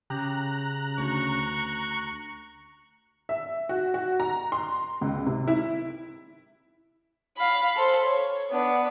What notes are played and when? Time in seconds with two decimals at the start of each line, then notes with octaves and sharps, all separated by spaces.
0.10 C#3 G4 A#5 F#6
0.98 D2 C#6
3.29 E5
3.69 F#4
3.94 F#4
4.20 A#5
4.52 C6
5.01 C#2
5.26 C3
5.48 E4
7.37 F5 B5
7.76 A4 C5
8.05 C#5
8.51 B3 D4